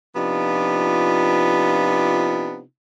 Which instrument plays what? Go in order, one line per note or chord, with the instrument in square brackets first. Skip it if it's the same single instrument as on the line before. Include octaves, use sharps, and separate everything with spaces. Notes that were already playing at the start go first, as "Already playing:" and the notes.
[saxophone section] C3 F3 B3 D4 D#4 F4